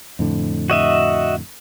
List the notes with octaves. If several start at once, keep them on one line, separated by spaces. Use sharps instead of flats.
F2 A2 D3
F#4 D#5 E5